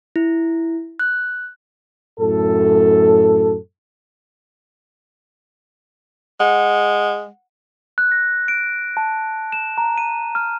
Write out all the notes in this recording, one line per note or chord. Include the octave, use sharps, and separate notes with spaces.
E4
F#6
F#2 A2 A4
G#3 F#5
F#6
A#6
D7
A5
E7
A#5
D#7
F6